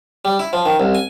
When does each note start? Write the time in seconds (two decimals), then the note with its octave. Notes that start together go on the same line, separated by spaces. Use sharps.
0.25 G3
0.39 E4
0.53 F3
0.66 D#3
0.80 C2
0.95 G#5